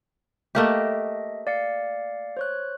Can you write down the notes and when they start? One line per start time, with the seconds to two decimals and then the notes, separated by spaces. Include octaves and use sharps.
0.55 A3 A#3 G4 D#5 E5
1.47 D5 F5 C#7
2.37 C5 C#5 F#6